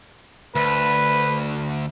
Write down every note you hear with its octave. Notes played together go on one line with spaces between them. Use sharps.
D2 B4